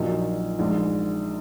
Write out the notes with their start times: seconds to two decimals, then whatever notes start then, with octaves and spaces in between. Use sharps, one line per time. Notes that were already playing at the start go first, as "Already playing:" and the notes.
Already playing: A#1 A#2 F#3 D#4 F#4
0.59 A#1 G#2 G#3